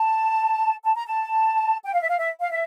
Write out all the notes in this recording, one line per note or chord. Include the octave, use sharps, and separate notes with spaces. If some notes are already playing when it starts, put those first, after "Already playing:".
Already playing: A5
A5
A#5
A5
G5
F5
E5
F5
E5
F5
E5